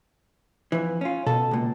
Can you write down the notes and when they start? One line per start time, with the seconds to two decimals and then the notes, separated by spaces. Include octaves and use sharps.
0.72 F2 E3
1.01 C#4 F4
1.27 B2 A4
1.51 C#2 A#2